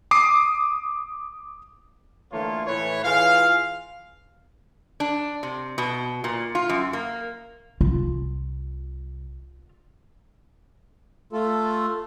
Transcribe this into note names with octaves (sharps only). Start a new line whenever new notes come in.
D6 D#6 C7
D3 E3 A3 A#3 F4 C#5
A2 E3 E4 B4 C#5
E3 F4 G#4 F5
D4
C3
B2
A#2
F4
F#2
A#3
C2 F4
A3 F4 A4